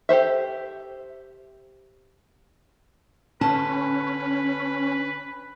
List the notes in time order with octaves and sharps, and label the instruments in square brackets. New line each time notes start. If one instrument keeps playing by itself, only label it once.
[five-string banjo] G4 A4 C5 E5
[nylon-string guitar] D3 A5 [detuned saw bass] C#4 [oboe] B4